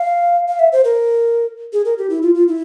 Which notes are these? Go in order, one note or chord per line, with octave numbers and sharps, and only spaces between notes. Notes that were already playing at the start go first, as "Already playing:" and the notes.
Already playing: F5
F5
E5
C5
A#4
G#4
A#4
G4
E4
F4
F4
E4